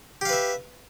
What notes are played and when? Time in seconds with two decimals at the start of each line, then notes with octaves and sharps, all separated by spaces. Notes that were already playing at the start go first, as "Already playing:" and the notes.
0.21 G4
0.25 F5
0.29 B4
0.33 E5